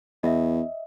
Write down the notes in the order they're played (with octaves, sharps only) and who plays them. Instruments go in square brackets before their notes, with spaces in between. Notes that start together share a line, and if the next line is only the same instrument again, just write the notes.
[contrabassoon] E2 [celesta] D#5 E5